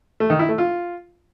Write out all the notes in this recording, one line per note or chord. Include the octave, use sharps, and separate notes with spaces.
A3
D#3
E4
A3
F4